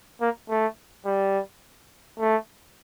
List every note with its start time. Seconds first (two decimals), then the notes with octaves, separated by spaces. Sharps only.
0.21 A#3
0.50 A3
1.06 G3
2.19 A3